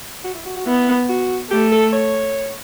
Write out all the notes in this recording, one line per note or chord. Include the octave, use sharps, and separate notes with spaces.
F#4
E4
F#4
F#4
B3 E4
F#4
A3 G4
A4
C#5